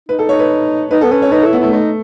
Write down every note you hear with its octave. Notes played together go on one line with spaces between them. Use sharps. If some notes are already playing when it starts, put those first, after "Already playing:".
D#4 B4
A4
D#4 C#5
B4
D#4 B4
B3 A4
C#4 B4
C#5
D#4 B4
A4
E4
B3
A3 E4
A3 D#4